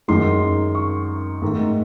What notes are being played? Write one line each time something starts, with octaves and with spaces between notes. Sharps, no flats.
F#2 D#3 G#3 C6
C#6
G#2 D#3 A3